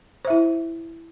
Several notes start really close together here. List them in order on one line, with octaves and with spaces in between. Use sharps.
C5 E5 E4